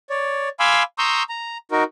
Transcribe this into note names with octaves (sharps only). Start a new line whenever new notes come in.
C#5 D5
F5 G#5 B5 C6 D6 E6
A#5 C6 C#6 D#6 E6 G6
A#5
D#4 F#4 A#4